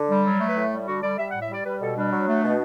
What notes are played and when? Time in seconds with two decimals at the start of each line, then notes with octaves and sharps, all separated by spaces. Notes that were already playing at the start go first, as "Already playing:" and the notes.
Already playing: D3
0.09 G3
0.25 F#3
0.40 A3
0.48 B4
0.55 A2
0.71 G3
0.87 D3 F#4
1.02 G3 D5
1.18 G3 E5
1.30 F#5
1.34 A2
1.41 E5
1.50 G3 D5
1.65 G3 B4
1.80 B2 A4
1.96 G3 D4
2.11 F#3
2.27 A3
2.43 B2